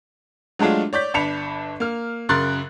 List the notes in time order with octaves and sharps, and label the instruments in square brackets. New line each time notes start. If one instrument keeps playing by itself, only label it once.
[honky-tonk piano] F#3 G#3 A3 D4 F4
C#5 D5 G6 B6
G1 D4 A5 B5 C#7 F7
A#3 F6
F#2 C#3 A#4 C6 F#6 A6